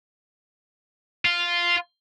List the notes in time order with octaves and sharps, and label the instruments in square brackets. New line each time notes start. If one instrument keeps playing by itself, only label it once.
[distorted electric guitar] F4